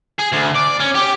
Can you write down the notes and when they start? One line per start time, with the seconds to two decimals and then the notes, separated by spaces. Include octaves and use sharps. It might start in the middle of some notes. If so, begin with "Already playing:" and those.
0.19 G#4
0.33 D2
0.56 D5
0.80 C#4
0.95 G4